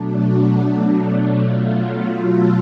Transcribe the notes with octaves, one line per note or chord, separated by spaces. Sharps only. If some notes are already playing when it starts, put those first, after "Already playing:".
Already playing: B2 F#3 A3 D4
D4
B2 F#3 A3 F4
A4